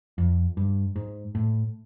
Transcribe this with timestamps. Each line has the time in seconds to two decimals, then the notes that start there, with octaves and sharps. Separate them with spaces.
0.18 F2
0.57 G2
0.96 G#2
1.35 A2